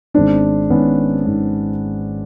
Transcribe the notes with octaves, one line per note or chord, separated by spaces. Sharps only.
G#1 G#2 D#3 G#3 B3 C4 D4
G#1 G#2 D#3 G#3 B3 C#4
G#1 G#2 D#3 G#3 B3